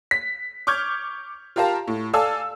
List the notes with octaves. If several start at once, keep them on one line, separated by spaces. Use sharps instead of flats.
B6
C#6 D6 F6 G6 G#6
F4 G4 A#4 F5 A5 A#5
A2
A4 D5 F5 G#5 A5 E6